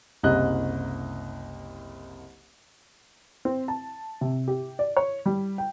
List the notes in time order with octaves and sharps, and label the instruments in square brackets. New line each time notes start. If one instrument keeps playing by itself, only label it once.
[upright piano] F#1 C2 D#5 F#6
C4
A5
C3
G4
D5
C#5
G3
G5